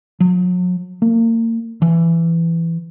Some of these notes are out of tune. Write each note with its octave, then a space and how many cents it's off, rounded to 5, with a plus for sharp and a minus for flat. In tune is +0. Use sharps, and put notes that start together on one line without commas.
F#3 -40
A#3 -35
E3 +15